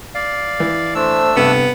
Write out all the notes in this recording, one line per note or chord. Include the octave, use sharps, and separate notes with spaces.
D5 F5
E3
A3 D4 C5 E6
G2 C3 B3 A4